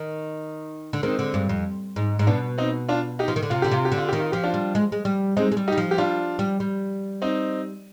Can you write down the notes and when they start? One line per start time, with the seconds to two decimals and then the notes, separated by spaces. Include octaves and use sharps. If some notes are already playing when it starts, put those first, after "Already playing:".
Already playing: D#3
0.93 D3
1.03 D#3 G#3 C4
1.19 D3
1.34 G2
1.49 F2
1.96 G#2
2.19 G#2
2.27 B2 B3 D4
2.58 C4 D#4
2.89 D4 F4
3.19 D#4 G4
3.28 F3
3.36 D#3
3.43 D3
3.50 C3 F4
3.62 D3 G4
3.71 C3 F4
3.85 G4
3.92 D3
3.97 F4
4.09 D#3 G4
4.20 F4
4.32 F3 G4
4.44 D4 F4
4.54 G3
4.75 G#3
4.92 G#3
5.05 G3
5.37 G#3 C4 D#4
5.52 G#3
5.57 G3
5.68 D#4 G4
5.72 G3
5.77 F3
5.91 G4
5.98 G3 D4 F4
6.39 G3
6.60 G3
7.22 C4 D#4